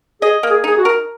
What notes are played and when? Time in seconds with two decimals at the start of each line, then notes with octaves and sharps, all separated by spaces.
0.22 G#4 D#5
0.43 A#3
0.50 G#4
0.64 D#4 G#4
0.78 F#4
0.85 A#4